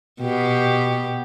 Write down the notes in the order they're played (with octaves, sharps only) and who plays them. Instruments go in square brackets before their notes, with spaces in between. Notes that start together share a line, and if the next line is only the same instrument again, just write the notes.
[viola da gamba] B2 G4